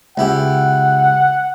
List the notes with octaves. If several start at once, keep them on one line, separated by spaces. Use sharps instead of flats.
C#2 E4 G4 F#5